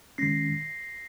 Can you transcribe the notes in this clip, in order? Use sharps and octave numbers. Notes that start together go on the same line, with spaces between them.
D#3 G#3 C#4 A#6 C7